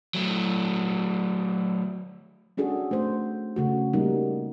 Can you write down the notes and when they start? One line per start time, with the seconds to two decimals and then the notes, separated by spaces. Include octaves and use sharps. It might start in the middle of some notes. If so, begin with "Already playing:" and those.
0.14 F#3 A3
2.57 C#4 D4 F#4 G#4 A4
2.91 A3 C5
3.56 C#3 A3 F#4
3.93 G3 A#3 D#4